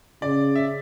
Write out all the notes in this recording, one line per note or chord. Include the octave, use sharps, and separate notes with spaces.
C#3 D5
E5